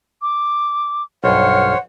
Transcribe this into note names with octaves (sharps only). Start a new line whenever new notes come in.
D6
B1 G2 C5 C#5 F#5 F6